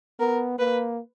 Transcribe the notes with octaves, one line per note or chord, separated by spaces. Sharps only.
B3 A#4
A#3 B4